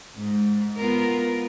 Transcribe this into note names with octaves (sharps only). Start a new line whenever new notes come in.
G#2
B3 F4 A#4